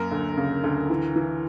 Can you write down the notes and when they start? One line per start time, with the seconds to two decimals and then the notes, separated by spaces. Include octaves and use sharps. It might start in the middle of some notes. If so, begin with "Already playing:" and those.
Already playing: F#2 A#3 A#4
0.12 D2
0.37 C#3
0.64 D2
0.90 E3
1.16 E3